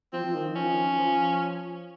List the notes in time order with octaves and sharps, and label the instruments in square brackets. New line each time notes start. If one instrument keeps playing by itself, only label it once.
[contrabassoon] F3 [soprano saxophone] C4
[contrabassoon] F3
D#3
D#3
[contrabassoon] F3 [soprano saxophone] C#4
[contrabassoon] F3